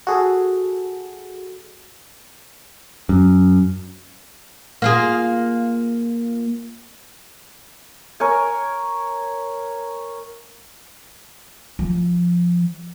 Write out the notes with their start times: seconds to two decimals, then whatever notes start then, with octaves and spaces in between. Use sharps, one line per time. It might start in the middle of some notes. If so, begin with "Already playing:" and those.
0.07 F#4 G#4 A4
3.09 F#2
4.82 A#3 F4 G#4
8.20 A#4 C#5 G#5
11.79 F3